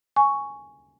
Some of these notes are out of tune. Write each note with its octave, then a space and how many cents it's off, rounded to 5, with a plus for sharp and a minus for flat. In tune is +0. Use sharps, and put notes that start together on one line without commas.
G#5 +0 C#6 +5